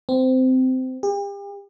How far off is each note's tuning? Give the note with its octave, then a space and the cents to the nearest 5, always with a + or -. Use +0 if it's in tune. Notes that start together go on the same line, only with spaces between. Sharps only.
C4 -20
G4 +40